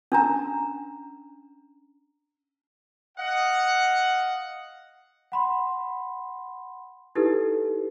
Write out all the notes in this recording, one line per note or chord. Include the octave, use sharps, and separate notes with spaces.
C#4 D4 A#5
D#5 F5 F#5
F#5 B5 C6
D#4 E4 G4 A4 B4